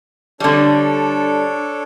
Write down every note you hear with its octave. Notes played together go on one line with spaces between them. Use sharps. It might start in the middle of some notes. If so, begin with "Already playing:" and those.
D3 G3 D4 A4 C#5